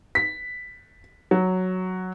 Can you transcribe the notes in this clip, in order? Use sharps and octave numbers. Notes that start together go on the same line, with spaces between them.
B6
F#3